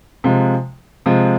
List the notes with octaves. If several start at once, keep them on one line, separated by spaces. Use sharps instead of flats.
C3 F3 G#3
C3 F3 G#3